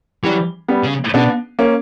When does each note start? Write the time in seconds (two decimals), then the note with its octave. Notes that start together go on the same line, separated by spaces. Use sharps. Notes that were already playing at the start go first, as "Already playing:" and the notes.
0.23 E3 F#3 G3
0.68 G3 B3
0.84 C#3
1.14 B2 B3 D4
1.59 A#3 C#4